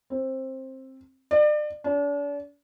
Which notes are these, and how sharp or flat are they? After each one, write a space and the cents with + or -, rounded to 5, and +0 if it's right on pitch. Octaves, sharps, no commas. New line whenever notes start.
C4 +15
D5 +35
D4 -40